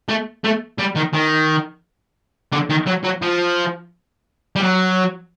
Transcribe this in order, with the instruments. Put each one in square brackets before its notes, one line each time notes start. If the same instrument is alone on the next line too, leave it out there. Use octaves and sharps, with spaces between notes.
[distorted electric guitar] A3
A3
G3
D#3
D#3
D3
D#3
F#3
F#3
F3
G3
F#3